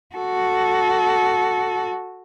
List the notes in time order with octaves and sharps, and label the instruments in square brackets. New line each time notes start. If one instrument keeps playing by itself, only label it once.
[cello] F#4 A4